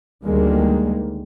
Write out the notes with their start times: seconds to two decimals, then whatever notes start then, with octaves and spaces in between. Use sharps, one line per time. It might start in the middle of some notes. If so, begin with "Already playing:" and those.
0.25 D2 D#3 G3 G#3 A#3